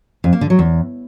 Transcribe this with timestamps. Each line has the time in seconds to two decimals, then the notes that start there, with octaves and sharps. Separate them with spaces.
0.24 F2
0.33 A#3
0.41 D3
0.50 F#3
0.59 E2